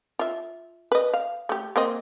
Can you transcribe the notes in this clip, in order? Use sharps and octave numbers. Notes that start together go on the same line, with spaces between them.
F4 E5
B4 D#5
F5
A3 G4
A#3 C4 D#5